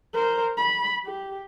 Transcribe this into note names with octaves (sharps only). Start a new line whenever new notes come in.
A#4 C5
B5
G4